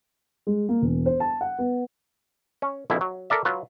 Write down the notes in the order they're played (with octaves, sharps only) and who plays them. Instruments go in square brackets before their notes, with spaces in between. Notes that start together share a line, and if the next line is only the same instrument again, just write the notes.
[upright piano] G#3
A#3
E1
C5
A5
F#5
B3
[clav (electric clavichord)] C#4
A#1 F2 B2 E4
F#3
A4 A#4 D5 E5
F#3 F4 B4